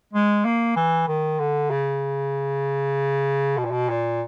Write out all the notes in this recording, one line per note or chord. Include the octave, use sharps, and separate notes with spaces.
G#3
A#3
E3
D#3
D3
C#3
B2
A#2
B2
A#2